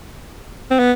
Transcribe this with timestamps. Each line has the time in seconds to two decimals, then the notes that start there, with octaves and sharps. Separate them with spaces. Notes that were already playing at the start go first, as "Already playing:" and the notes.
0.71 C4
0.80 B3